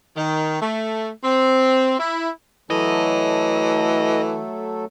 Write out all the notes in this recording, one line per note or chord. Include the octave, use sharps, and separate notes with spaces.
D#3
A3
C4
E4
E3 F#3 A3 A4 D#5